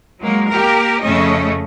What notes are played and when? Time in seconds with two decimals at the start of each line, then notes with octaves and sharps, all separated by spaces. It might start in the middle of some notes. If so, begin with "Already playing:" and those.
0.20 F#3 G#3 A#3
0.50 A#3 G4 A#4
1.01 F2 C#3 A3 C#4 D#5